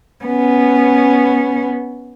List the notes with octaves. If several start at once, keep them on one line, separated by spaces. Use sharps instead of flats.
B3 C#4